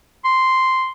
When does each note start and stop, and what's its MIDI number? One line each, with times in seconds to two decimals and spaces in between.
0.25 0.91 84